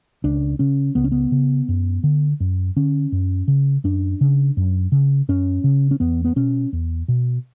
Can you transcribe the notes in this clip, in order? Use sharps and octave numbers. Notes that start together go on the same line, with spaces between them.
C#2 D4
C#3 C#4
C#2 B3
C#4
B3
C#3
F#2
D3
F#2
D3 C#4
F#2
C#3
F#2 D4
C#3
F#2
C#3
F#2 C#4
C#3
C#4
E2 B3
B3
B2 C#4
E2
B2